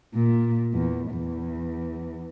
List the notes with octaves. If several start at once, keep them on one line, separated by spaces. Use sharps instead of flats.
A#2
E2
E2